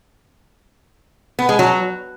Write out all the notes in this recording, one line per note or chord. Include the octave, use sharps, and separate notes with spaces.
B3
G#3
F#3